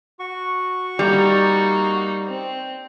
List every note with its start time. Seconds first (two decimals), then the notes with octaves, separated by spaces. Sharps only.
0.19 F#4 C#6
0.99 G3 A#3 D#4
2.26 C4